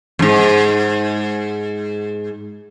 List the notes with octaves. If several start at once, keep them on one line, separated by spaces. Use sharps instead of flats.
E2 G#2